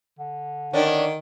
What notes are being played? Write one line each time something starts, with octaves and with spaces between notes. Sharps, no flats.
D3
D#3 C#4 D4